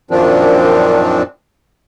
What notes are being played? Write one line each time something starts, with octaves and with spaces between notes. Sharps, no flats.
F#2 A#2 D#3 F3 C4 D4